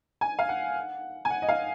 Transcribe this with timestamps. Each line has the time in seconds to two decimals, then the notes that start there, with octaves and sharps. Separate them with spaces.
0.21 G#5
0.39 F5
0.49 F#5
1.25 G#5
1.30 F#5
1.42 D#5
1.49 F5